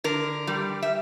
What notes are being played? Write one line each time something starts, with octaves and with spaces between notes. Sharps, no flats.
D3 A#4
G3
E5